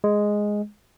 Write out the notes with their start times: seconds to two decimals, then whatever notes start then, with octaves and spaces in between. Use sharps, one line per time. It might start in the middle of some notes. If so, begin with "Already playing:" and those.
0.04 G#3